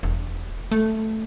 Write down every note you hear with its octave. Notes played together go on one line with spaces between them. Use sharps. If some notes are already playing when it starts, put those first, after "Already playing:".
E1
A3